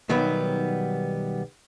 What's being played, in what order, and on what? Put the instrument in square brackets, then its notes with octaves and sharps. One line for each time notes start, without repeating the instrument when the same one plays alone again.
[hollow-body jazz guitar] B1 D#3 F#3 G3 B3